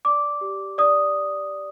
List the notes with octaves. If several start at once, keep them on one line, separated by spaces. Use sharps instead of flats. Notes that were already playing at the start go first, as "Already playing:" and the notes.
D5 D6
G4
D5 D#6